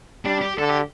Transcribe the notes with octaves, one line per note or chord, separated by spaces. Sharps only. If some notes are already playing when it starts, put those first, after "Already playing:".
G3 D4
G4
D3 A4
G4